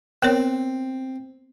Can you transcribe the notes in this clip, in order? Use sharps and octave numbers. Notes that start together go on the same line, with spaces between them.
B3 C4 A#4 C#5